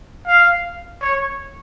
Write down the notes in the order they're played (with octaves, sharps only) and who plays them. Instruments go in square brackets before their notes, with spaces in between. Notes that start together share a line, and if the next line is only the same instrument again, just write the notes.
[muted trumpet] F5
C#5